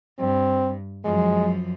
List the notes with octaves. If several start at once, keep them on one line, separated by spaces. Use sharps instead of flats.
G2 C4
F#2 F3 G#3